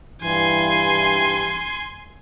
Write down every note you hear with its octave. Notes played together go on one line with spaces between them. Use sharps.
G2 E3 G#5 C6